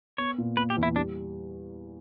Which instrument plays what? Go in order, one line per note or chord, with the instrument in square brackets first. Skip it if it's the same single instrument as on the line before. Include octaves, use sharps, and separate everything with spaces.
[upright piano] B3 [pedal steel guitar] C#5
[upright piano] A#2
[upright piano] A#3 [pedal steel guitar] B4
[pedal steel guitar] G4
[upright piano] E2
[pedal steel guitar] E4
[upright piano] G3 [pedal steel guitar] D4